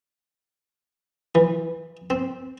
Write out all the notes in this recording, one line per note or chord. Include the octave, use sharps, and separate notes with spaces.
E3
C4